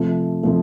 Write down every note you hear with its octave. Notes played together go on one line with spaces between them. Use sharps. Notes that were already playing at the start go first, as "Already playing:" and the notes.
Already playing: C3 F3 A3
C3 F3 A3